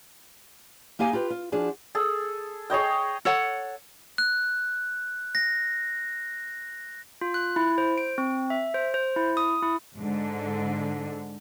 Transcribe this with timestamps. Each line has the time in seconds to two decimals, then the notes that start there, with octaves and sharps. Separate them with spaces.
0.99 A#3 D#4 G4 F5 G#5
1.13 F4 G4 B4
1.30 F4
1.52 F3 D4 F#4 G#4
1.95 G#4 A4
2.70 G#4 C#5 D#5 G5
3.25 A4 C#5 F#5
4.18 F#6
5.35 A#6
7.21 F4
7.34 F#6
7.56 E4
7.78 C5
7.98 D7
8.18 C4
8.50 E5
8.74 C5
8.94 C5
9.16 E4
9.37 D#6
9.63 E4
9.98 G#2 D3